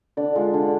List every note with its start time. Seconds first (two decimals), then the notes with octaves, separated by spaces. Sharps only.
0.17 D3 D5
0.36 G#3 F4
0.54 D3